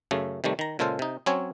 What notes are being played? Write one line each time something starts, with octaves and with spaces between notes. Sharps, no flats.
F#2 C#3 A3
C3 D#3 G3 A3
D#3 A#5
A#2 C#3 G#3 A4 C5 F5
C3 D#4
F#3 C4 C#4 C#5 G#5